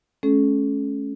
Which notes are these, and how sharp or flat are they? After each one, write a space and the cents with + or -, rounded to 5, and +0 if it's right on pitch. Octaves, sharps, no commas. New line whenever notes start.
A3 -40 C#4 +0 A4 -40